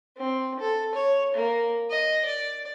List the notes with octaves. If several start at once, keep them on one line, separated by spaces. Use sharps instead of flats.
C4
A4
C#5
A#3
D#5
D5